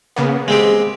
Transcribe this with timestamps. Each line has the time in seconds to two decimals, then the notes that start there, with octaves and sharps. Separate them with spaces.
0.16 C#3 A#3 B3
0.48 G#3 C4 G4